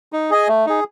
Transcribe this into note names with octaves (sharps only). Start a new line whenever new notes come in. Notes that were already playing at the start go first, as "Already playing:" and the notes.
D#4
G#4 D#5 G#5
A3
D#4 G#4